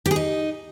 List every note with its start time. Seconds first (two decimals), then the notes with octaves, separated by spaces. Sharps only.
0.06 G4
0.11 G#4
0.16 D#4